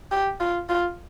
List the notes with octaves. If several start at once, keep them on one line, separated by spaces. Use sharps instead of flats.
G4
F4
F4